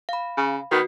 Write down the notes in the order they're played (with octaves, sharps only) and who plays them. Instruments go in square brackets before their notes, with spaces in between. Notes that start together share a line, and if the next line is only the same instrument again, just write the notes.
[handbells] F5 B5
[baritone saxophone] C#3
[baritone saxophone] D#3 [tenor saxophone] B3 [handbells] F#4